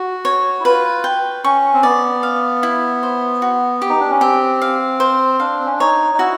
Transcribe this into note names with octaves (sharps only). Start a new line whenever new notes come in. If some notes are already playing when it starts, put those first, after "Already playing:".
Already playing: F#4
C#5
E4
F4 B4
G5
C#4 C#6
C4
B3 D5
F5
E4
C5
F#4
G4
D#4
D4
C#4
C4 G4
F5
C5
D4 F5
C4
C#4
D4
D#4 C#5
D#4
E4 F#4